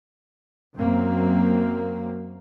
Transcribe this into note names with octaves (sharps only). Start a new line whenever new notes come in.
F#2 F#3 A#3 C4